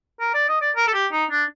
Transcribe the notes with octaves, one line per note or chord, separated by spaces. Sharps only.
A#4
D5
D#5
D5
A#4
A4
G4
D#4
D4